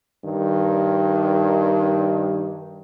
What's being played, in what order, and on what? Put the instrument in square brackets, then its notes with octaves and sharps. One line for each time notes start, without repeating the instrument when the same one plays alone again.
[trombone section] G2 D#3